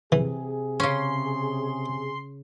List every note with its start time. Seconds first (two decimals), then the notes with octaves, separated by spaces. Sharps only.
0.12 C3 E3 G#4
0.80 C#3 C#4 C6